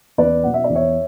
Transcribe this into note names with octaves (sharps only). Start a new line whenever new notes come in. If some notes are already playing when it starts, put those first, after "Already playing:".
E2 B4 D5
B2 F#3 F#5
E5
D5
E2
C#5 E5